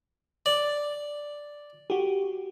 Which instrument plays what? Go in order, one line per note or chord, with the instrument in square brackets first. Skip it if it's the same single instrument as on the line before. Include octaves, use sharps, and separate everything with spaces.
[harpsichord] D5
[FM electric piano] F#4 G4